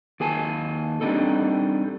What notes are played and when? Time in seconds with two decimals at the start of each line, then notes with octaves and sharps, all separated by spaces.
0.20 D#2 G#4 G#5 A5
1.01 G3 C4 D4 D#4 A4